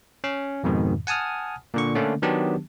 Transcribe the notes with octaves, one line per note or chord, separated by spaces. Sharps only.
C#4
F2 G#2 B2 D#3
F#5 G#5 A5 D#6 F6
A#2 D3 C#6
D3 A3 A#3 C#4 D4
D#3 F#3 B3 D4 G4 A5